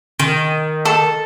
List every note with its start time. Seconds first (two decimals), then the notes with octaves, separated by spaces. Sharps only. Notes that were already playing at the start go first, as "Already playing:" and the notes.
0.20 D#3
0.85 A4